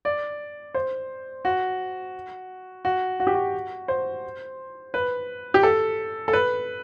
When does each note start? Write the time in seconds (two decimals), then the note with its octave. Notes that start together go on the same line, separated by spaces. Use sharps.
0.05 D5
0.74 C5
1.45 F#4
2.85 F#4
3.20 F#4
3.27 G4
3.35 F#4
3.88 C5
4.94 B4
5.54 G4
5.63 A4
6.28 A4
6.33 B4